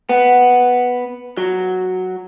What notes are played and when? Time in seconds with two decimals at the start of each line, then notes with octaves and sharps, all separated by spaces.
0.09 B3
1.37 F#3